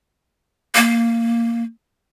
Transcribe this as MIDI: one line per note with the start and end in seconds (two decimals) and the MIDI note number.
0.75 1.63 58